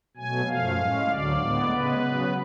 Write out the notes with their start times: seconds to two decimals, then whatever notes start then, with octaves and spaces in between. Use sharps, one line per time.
0.17 B2 F#3 A3 G#5
0.47 F#2 F3 A3 F5
0.79 A2 G#3 C#4
1.08 D2 D3 F#3 D5
1.39 A2 G#3 B3
1.69 C#3 G#3 B3 B4
2.01 C#3 F#3 B3